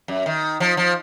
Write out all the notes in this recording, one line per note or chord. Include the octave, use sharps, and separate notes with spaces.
F#2
D#3
F3
F3